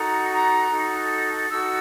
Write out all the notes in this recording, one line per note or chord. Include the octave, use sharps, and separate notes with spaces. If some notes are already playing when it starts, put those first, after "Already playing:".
Already playing: D#4 F#4 A4 A#5
A#5
D#4 F#4 A4
D#4 F#4 A4 E6